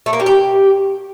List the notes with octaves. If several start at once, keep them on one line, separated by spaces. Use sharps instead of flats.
A3
A#3
G3
G4